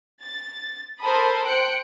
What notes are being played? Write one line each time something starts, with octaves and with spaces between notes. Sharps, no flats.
A6
A4 A#4 C5 A5 B5 D#6
C5 G5 F#6 C#7 D7